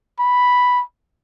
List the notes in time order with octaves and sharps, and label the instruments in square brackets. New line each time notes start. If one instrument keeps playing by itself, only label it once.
[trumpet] B5